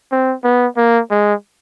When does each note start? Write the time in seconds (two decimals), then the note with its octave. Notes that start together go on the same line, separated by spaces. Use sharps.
0.12 C4
0.44 B3
0.77 A#3
1.11 G#3